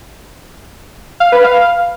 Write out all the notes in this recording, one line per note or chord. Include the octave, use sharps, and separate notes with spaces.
F5
B4
F5